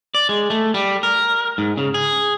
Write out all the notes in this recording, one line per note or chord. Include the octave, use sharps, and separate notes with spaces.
D5
G#3
A3
G3
A#4
G#2
C#3
G#4